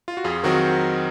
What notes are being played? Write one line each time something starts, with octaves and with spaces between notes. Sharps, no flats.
F4
F#4
F2 F4 G#4
D#3 F#3 C4 F#4 A#4